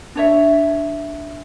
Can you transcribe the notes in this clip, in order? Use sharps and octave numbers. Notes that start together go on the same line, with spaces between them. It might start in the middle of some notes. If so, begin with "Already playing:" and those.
D4 C#5 E5